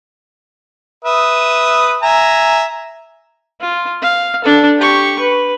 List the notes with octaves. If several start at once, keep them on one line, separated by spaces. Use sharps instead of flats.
B4 E5 D#6
E5 G#5 A#5
F4
F5
D4 A4
G4 C#6
B4